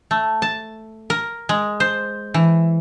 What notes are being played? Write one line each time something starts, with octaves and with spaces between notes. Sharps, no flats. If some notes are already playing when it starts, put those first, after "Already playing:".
A3
A5
A#4
G#3
C5
E3